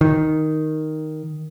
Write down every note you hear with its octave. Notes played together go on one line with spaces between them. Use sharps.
D#3